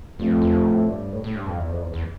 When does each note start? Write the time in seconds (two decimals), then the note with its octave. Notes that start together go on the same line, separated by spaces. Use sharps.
0.19 G2 F3 A3 C4
0.31 F2
0.42 E2
0.53 F2
0.65 A2
0.89 G2
1.12 A2
1.24 A2
1.35 G2
1.47 F2
1.59 E2
1.70 F2
1.82 E2
1.93 E2